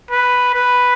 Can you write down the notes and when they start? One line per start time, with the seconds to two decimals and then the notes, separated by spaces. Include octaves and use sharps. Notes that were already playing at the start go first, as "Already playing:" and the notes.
0.11 B4
0.54 B4